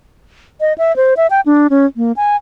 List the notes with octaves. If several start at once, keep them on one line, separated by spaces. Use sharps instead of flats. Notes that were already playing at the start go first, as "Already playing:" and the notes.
D#5
E5
C5
E5
G5
D4
C#4
A#3
G#5